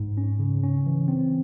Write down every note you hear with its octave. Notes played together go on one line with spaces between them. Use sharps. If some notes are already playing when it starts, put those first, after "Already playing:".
Already playing: G#2
C#4
C#3
C#4
E3
C4